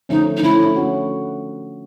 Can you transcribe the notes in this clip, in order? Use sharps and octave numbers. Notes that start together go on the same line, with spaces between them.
D3 F3 A3 C#4 D#4
D#4
D3 F3 A3 C#4 E4
A3 C#4 F#4